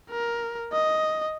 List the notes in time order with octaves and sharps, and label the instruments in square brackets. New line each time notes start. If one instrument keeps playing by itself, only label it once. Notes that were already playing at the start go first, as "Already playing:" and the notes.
[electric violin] A#4
D#5